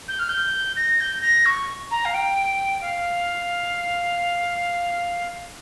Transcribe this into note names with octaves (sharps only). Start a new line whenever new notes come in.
G6
F6
G6
A#6
G6
A#6
C#6
A#5
F5
G5
F5